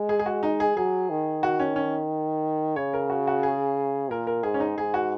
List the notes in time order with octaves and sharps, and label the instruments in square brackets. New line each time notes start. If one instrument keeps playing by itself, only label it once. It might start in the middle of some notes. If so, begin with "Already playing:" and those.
Already playing: [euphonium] G#3
[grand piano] G#4
G#4
F#4
D#4
G#4
[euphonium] F#3 [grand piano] G#4
[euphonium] D#3
[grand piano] F#4
C#4
C#4
[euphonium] C#3 [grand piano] C#5
[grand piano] A#4
F#4
F#4
G#4
[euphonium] A#2 [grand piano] A#4
[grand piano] A#4
[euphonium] G#2 [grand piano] G#4
[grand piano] C#4
D#4
[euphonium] G#2 [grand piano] G#4
[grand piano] F#4